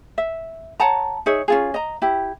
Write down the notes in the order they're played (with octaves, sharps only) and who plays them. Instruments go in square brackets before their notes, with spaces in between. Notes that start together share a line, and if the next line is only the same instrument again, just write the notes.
[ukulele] E5
C#5 F#5 A5 A#5
D#4 G#4 C#5 E5
C#4 F4 G#4
D#5 A#5
E4 G4